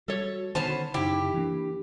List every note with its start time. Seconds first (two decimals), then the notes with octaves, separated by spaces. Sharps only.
0.08 G3 F#4 A4 C#5
0.55 D3 D#3 B3 C#4 C5 A5
0.94 F#2 C#3 D#4 E4 G4
1.34 E3 A#3 D4